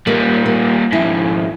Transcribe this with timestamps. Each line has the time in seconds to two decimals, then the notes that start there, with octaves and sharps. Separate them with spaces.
0.07 A#2 G3 A#3
0.46 A#3
0.93 F2 G#2 E4